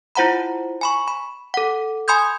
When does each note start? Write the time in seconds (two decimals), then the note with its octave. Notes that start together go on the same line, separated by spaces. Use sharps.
0.15 E4 F4 C5 F#5 A#5 B5
0.81 G#5 B5 C#6
1.08 B5
1.54 A4 F#5
2.08 G#5 B5 C6 D#6 G6 G#6